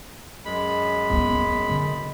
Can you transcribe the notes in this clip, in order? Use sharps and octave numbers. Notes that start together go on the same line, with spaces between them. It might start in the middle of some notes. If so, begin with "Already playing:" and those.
F#2 G#3 B5
B3 C#4
D3